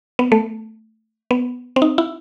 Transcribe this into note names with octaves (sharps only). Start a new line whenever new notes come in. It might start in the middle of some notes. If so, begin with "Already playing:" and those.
B3
A3
B3
C4
D#4
E4